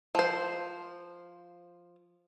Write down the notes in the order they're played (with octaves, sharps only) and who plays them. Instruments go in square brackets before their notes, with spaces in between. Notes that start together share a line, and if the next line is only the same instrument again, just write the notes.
[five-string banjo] F3 C5